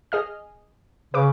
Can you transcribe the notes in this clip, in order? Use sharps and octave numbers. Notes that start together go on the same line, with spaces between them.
G#4 D#5 F6
C#3 B4 D6